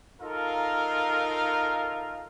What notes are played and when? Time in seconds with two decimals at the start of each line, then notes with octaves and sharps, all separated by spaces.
0.21 D#4 F4 A4 A#4 F5